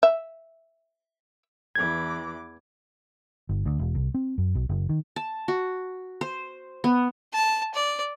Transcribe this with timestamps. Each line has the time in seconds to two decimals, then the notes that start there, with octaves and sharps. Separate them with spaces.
0.03 E5
1.75 E2 E3 D6 G#6
3.49 G1
3.66 D2
3.79 E1
3.95 C2
4.14 C4
4.38 F#2
4.55 B1
4.69 F#1
4.89 D#3
5.16 A5
5.48 F#4
6.21 C5
6.84 B3
7.33 A5
7.74 D5